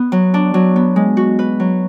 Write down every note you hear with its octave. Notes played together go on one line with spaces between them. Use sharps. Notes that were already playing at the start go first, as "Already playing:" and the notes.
Already playing: B3
F#3
D4
F#3
B3
G#3
F#4
B4
F#3